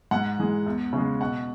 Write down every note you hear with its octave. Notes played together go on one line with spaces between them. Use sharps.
G#2 F#5
E3 G#3
E2
C#3 G#3
B2 F#5